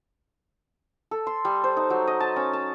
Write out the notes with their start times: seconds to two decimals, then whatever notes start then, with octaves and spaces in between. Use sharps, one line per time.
1.11 A4
1.27 C6
1.45 G3
1.64 C5
1.77 D#4
1.90 F#3
2.07 D#5
2.20 A5
2.36 C#4
2.53 A5